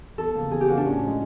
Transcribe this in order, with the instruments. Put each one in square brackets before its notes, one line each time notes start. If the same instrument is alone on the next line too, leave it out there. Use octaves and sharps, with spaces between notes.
[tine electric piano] E2 [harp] A4
[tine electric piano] C#3 F3 A#3
[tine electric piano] E2 [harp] G#4
[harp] G4
[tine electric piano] C#3 F3 A#3 [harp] F#4
[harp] D4
[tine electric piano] A2 [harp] C#4
[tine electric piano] F3 G#3